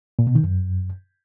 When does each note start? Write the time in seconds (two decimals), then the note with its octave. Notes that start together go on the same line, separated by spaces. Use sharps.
0.19 A#2
0.27 B2
0.35 D#3
0.44 F#2